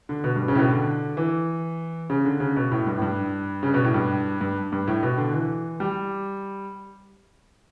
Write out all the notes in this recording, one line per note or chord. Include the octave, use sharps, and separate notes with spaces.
D3
B2
G2
C#3
A2
B2
D3
E3
C#3
D3
C#3
B2
A2
G2
A2
G2
C#3
B2
A2
G2
G2
G2
A2
B2
D3
E3
G3